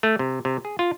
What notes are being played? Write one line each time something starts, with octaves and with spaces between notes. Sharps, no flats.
A3
C3
C3
G#4
F4